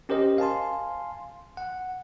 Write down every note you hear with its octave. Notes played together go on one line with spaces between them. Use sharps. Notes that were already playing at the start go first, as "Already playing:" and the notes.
C#4 G4 A#4 C5 D#5
F5 G#5 A5 C6
F#5